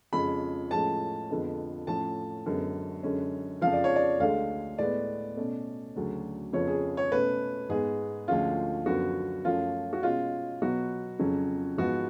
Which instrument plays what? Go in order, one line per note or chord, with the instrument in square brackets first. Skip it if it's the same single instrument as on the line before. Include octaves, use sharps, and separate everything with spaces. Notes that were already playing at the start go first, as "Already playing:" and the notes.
[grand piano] F2 C#3 G#3 C#4 B5
A2 F3 G#3 C#4 A5
F2 D3 G#3 B3
A2 F3 A3 C#4 A5
F#2 D3 G#3 B3
F#2 D3 G#3 C#4
F2 C#3 F3 F5
D5
C#5
D5
D2 D3 G#3 F5
A2 G#3 B3 D5
B2 A3 C#4
D2 C#3 F#3 C#4
F2 C#3 F3 B3 C#5
G#4
C#5
B2 A3 C#4 B4
G#2 G#3 B3 G#4
D2 D3 F3 G#3 C#4 F4
F#2 D3 F3 B3 F#4
F#2 F3 A3 C#4 F4
F#4
B2 G#3 C#4 F4
B2 F#3 B3 F#4
F2 C#3 F#3 C#4
G#2 F3 G#3 B3 F#4